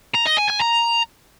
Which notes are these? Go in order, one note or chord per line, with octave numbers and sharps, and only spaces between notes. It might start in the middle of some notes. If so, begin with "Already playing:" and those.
A#5
D#5
G#5
G#5
A#5